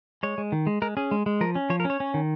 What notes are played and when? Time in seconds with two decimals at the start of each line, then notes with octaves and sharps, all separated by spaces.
0.23 G#3 C#5
0.38 G#3
0.52 D#3
0.67 G#3
0.82 G#3 A#4
0.97 C#4 G#4
1.11 G#3
1.26 G#3
1.41 F3 A#4
1.55 C#4
1.70 F3 C#5
1.80 A#4
1.85 C#4
1.90 C#5
2.00 C#4
2.14 D#3